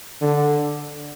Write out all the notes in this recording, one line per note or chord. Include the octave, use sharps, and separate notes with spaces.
D3